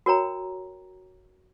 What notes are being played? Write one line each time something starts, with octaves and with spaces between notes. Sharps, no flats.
F#4 A#4 C#5 G5 A#5